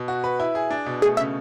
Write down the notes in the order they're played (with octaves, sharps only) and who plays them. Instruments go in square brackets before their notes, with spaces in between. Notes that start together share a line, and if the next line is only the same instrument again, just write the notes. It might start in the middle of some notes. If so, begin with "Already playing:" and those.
Already playing: [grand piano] B2
F#4
B4
E4
G#4
D4
B2
[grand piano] A3 [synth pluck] G#4
[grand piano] C#3 [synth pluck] E5